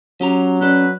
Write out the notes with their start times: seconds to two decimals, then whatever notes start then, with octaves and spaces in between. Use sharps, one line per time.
0.21 F#3 C#4 G4 A#5
0.61 C#4 A4 B4 D5